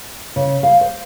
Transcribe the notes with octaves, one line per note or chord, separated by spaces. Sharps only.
C#3
F5
C5